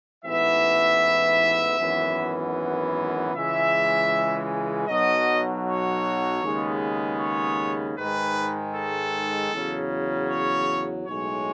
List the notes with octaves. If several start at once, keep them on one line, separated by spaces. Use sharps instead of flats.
A1 G#2 E3 B3 E5
G#1 F#2 E3 B3
C#2 C#3 E3 G#3 E5
B1 B2 F#3 D#5
C#5
D#2 C#3 G#3 B3
C#5
G#2 D#3 G#3 B4
A4
E2 C#3 F#3
C#5
B1 A2 G#3 C#5